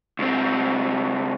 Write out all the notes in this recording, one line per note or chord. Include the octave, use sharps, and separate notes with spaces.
C#2 C4